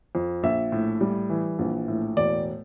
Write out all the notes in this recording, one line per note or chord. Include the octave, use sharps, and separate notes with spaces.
F2
A#1 E5
A2
G3
E3
A#1
A2
E1 D5